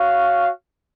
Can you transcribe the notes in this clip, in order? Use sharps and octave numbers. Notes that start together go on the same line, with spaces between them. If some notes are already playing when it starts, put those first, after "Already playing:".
Already playing: F#4 C#5 F5